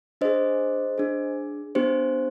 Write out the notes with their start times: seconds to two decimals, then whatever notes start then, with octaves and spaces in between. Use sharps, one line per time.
0.21 D4 G#4 C5 D#5
0.98 D4 G#4
1.75 B3 D4 G4 C5